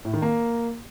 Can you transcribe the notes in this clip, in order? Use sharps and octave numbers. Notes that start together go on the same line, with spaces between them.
A2
D#3
A#3